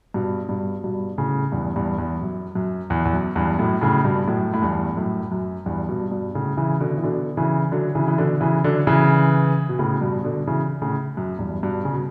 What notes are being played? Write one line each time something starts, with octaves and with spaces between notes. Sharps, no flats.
G2 B2
G2 B2
G2 B2
A2 C#3
E2 G2
E2 G2
E2
F#2
F#2
E2
E2
F#2
E2 G2
F#2 A2
A2 C#3
G2 B2
F#2 A2
A2
E2 G2
F#2 A2
F#2
E2 G2
G2 B2
G2 B2
A2 C#3
C#3 E3
B2 D3
E3
B2 D3
C#3 E3
D3 F#3
C#3 E3
E3
B2 D3
C#3 E3
D3 F#3
C#3 E3
B2
A2 C#3
G2 B2
B2 D3
C#3 E3
A2 C#3
F#2
E2 G2
G2 B2
C#3
B2